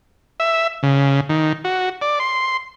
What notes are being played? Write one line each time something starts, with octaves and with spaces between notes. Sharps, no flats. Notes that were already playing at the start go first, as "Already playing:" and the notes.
E5
C#3
D#3
F#4
D5
C6